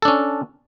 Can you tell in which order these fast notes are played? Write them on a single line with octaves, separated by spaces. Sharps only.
A4 D4 C#4